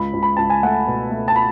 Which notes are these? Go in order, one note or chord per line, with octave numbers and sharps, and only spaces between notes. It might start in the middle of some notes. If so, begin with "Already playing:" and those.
Already playing: C#2 B5
C#2
B5
C#2 A5
G#5
A3 F#5
B2
A3
A5
B5